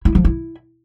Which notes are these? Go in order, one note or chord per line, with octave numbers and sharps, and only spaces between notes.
E4
F3
E4